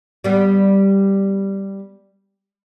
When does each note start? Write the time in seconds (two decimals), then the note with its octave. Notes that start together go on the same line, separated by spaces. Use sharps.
0.24 G3 B3